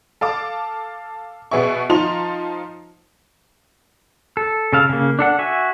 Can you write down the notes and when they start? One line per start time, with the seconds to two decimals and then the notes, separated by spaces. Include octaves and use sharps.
0.21 A4 F5 A5 D6
1.51 B2 B3 G#4 E5 C#6
1.89 F3 D#4 F4 A5 C6 F7
4.37 A4
4.73 C#3 A4 F5
4.89 C#3 A#3
5.19 D4 A4 F#5
5.39 F#4 E5 G#5